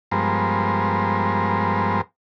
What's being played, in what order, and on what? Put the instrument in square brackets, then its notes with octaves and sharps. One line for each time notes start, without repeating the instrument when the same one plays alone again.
[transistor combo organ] G2 F3 G#3 B3 A#4 C5